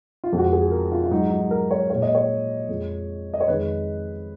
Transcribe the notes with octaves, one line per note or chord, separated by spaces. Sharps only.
F4
F2 F3 G#3
F#4
G#4
A#4
F4
F4
G#2 F#3 D#4
D#4
A#4
C#5
A#2 G#3 C#5
D#5
C#5
F2 F3 G#3
D#5
C#5
F2 D#3 G#3 B4